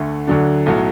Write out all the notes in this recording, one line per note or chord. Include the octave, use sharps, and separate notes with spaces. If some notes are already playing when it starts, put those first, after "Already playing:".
Already playing: D2 D3 A3
D2 D3 F#3 D4
B1 A2 F#3